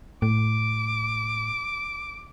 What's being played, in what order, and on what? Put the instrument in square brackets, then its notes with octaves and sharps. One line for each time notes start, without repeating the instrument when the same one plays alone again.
[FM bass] A2 [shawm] D6